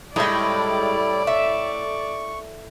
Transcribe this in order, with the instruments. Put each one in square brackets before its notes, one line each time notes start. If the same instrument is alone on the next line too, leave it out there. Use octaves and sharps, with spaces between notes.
[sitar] A2 [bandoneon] G3 E4 [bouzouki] G#3 D#4 [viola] D5
[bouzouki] E5 [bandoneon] C#6